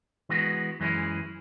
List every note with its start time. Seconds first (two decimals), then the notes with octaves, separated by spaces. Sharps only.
0.29 E3 G#3 B3 F#4
0.80 F#2 E3 G#3 C#4 E4